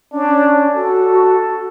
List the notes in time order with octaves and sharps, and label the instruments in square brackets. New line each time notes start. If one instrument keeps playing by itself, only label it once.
[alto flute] C#4 [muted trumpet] D4
[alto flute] F#4 [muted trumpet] A4